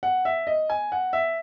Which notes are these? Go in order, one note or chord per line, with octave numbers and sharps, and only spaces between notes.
F#5
E5
D#5
G#5
F#5
E5